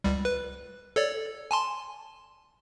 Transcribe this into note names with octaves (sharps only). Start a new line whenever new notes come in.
C#2 G3
B4
A4 C#5 D5
G#5 A5 C6